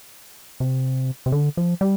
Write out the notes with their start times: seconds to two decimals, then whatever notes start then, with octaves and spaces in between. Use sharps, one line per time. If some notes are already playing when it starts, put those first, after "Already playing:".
0.60 C3
1.26 C3
1.32 D3
1.57 F3
1.81 G3